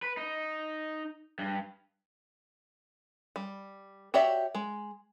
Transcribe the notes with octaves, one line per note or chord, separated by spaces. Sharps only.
B4
D#4
G2
G3
F#4 G4 C#5 D5 E5
G#3